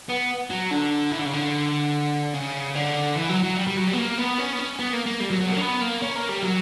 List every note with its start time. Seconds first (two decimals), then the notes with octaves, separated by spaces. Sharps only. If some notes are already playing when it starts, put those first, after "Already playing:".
0.09 B3
0.50 F#3
0.71 D3
1.12 E3
1.19 D3
1.26 C#3
1.33 D3
2.34 C#3
2.75 D3
3.16 E3
3.29 F#3
3.43 F#3
3.57 G3
3.67 G3
3.77 F#3
3.88 G3
3.93 B3
3.98 A#3
4.18 B3
4.38 C#4
4.53 B3
4.59 C#4
4.79 B3
4.93 A#3
5.06 A#3
5.20 G3
5.30 F#3
5.41 F#3
5.46 B3
5.51 A#3
5.57 C#4
5.61 B3
5.81 A#3
6.02 C#4
6.16 A#3
6.29 G3
6.43 F#3